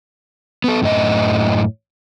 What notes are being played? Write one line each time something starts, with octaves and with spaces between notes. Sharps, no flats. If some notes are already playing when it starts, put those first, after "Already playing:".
B3 A4
F#2 A2 D#5